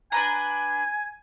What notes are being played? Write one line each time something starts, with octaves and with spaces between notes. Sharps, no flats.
D4 B4 G#5 A#5